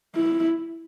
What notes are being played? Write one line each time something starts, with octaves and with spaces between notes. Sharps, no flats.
E4